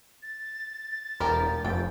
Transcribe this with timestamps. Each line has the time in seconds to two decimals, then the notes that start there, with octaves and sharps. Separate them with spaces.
0.23 A6
1.20 E1 F3 G4 A#4
1.64 F1 G5